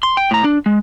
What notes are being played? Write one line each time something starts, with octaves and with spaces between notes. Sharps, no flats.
C6
G5
A2 A#5
D4
G#3